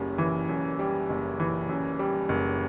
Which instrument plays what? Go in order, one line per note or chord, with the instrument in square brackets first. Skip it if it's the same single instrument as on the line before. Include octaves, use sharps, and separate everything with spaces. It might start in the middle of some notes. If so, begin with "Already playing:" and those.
Already playing: [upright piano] F#1 F#2 G3
E3
F#2
G3
F#1
E3
F#2
G3
F#1